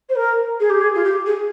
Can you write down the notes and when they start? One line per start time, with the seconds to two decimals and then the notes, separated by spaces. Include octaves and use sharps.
0.09 C5
0.15 A#4
0.59 G#4
0.69 G4
0.80 G#4
0.94 F4
1.03 G4
1.25 G#4